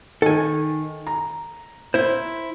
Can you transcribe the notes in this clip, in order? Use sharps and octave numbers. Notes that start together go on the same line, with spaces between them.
D#3 A4 G#5
A#5
E4 C5